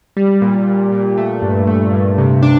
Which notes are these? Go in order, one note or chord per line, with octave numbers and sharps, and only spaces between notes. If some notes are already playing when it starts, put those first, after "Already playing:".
G3
A#2
A#2
A#2
A3
G2
A3
G2
C3
D4